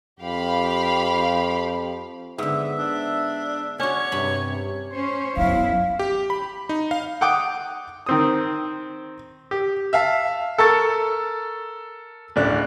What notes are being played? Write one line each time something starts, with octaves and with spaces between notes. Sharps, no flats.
F2 G4 F5 B5
G#2 D3 B3 E5
D4
C#4 D4 F#4 C#5
G2 C3 B5
C#4 C5 C#5
F#2 F#3 B3 E4 F5
G4
B5
D#4
F5
F#5 G5 D6 D#6
D#3 C4 D#6
G4
E5 F5 A5
A4 A#4 A5 C#6 A6
D1 C#3 D4 F#6